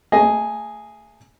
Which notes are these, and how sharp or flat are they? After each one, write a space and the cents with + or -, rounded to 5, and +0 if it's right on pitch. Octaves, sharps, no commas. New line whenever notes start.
A3 +30 G#4 +0 D#5 +0